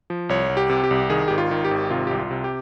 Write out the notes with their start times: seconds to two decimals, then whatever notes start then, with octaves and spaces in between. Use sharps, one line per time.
0.10 F3
0.29 C2 C#5
0.49 C2
0.57 G4
0.69 C3
0.84 G4
0.91 C2
1.10 D#3 G#4
1.28 G#1 G4
1.38 F4
1.51 D#3
1.65 G4
1.71 G#1
1.90 C3 F4
2.07 C2 G4
2.18 F4
2.31 C3
2.44 G4